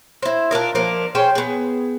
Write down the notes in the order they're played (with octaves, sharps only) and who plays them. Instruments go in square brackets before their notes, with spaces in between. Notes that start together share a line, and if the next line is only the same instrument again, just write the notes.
[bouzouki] E4 C5
D4 F4 A#4 D#5
F3 A#3 D4 A#4
C#4 G#4 C5 G5
B3 G#4